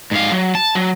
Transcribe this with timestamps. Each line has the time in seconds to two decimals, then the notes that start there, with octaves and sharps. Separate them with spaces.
0.11 G#2 F5
0.32 F#3
0.55 A5
0.75 F#3